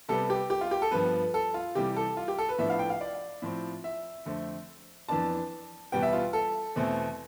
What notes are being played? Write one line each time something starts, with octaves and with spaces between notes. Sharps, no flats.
C3 G3 B3 A4
G4
G4
F4
G4
A4
G2 F3 B3 B4
A4
F4
C3 E3 G3 G4
A4
F4
G4
A4
B4
A2 F3 B3 D4 E5
F5
G5
F5
D5
A2 F3 C4
E5
F2 D3 A3 C4
F2 E3 B3 D4 A5
E2 B2 G3 B3 G5
E5
F4
A4
E2 B2 A3 C4